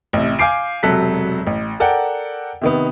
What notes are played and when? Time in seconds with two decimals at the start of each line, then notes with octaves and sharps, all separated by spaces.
0.13 A1 C3
0.39 F5 G#5 D6 G6 C7 D7
0.83 E1 C3 F#3 A4 F#6 B6
1.47 A1
1.80 A4 A#4 D5 F#5 G5
2.61 C3 D#3 B3